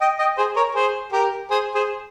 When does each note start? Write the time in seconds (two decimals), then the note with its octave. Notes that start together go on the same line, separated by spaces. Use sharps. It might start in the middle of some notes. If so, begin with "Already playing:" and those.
0.01 D#5 G5
0.18 D#5 G5
0.37 G#4 C5
0.56 A#4 C#5
0.75 G#4 C5
1.12 G4 A#4
1.51 G#4 C5
1.74 G#4 C5